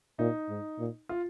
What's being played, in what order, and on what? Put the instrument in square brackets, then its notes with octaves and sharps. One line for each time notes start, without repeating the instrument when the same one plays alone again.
[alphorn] A#2 [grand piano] D#4
[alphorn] G#2
A#2
[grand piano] F4